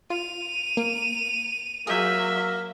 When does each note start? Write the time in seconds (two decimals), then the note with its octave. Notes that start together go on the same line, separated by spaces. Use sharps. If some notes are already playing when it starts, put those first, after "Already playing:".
0.10 F4 D#7 F7
0.77 A#3
1.87 F#3 A#3 G#4 E5 G6